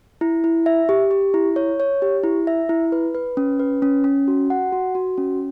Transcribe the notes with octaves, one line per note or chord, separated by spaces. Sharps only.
E4
E4
E5
G4
G4
E4
C#5
C#5
G4
E4
E5
E4
B4
B4
C#4
B4
C#4
C#4
F#4
F#5
F#4
F#4
C#4